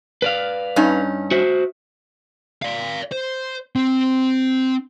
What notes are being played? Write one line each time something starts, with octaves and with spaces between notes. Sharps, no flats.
B4 D5 F5
G2 C#4 D#4
F#4 C5 E5
D5 F5
C5
C4